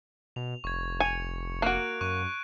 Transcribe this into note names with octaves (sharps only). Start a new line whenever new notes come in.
B2 F7
F1 C#6 G#6
G#5 C#7 F7
A#3 F#4 F#6 D7
F#2 C#6 F#6 D#7